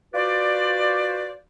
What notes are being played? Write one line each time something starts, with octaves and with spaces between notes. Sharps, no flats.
F4 F#4 B4 C5 D5